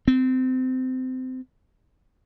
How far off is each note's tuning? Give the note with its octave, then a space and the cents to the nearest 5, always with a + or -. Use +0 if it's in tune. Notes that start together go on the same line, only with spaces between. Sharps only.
C4 -25